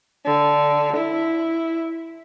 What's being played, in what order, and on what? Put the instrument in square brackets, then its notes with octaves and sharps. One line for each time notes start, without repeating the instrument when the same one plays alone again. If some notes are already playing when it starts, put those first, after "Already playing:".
[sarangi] D3
E4